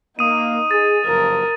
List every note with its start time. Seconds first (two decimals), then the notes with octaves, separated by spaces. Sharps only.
0.19 A#3 D#4 D#6 D#7
0.71 G#4 A6
1.05 F#1 G2 F3 A#4